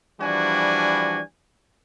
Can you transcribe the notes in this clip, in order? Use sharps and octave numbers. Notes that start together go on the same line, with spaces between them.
E3 F3 G3 D4 F#4 G#5